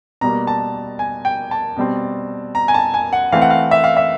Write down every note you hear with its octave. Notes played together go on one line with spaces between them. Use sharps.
B2 G3 A#3 A#5
A5
G#5
G5
A5
B2 G3 C4
A#5
G#5
A5
G#5
F#5
E3 A3 C4 F5
F#5
F5
E5
F5
E5